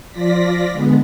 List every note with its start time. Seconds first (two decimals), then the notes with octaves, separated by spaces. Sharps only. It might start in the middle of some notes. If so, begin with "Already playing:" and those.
0.11 F3 F4 D5 A#6 B6
0.72 D3 G#3 B3